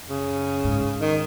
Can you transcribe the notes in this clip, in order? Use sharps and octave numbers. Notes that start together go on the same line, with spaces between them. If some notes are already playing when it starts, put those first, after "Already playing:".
Already playing: F#2
C#3
G#2
D#3